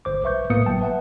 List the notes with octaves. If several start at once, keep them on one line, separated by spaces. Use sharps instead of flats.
G1 C5 D6
B1 B4 E5 C#6 G6
A2 A#3 B3 B4 D#6 C#7
G1 F#3 G5 A5
B4 E5 F#5 A5